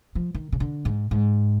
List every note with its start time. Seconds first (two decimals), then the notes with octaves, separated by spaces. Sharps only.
0.15 F3
0.35 D#3
0.52 C#3
0.60 D3
0.85 G#2
1.11 G#2